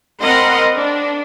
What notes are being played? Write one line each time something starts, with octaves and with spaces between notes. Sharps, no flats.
C4 A#4 D#5 F#5 B5 C6
D4